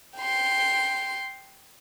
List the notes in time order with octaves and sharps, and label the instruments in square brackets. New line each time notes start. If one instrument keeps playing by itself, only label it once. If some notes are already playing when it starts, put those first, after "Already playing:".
[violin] G5 C6